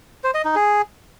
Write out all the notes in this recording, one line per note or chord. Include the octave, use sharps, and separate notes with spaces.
C5
D#5
D#4
G#4